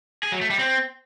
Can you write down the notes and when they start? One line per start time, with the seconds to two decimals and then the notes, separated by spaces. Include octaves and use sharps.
0.23 G#4
0.32 F#3
0.41 A3
0.50 G3
0.59 C4